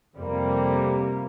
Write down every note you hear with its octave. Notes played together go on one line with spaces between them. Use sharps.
F2 C3 G3 A#3